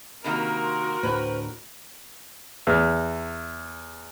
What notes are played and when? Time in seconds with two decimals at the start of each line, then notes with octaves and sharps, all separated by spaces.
0.24 C3 D#3 A#3 F#4 A#4 B5
0.63 C6
1.03 D2 A2 B4 C5
2.67 E2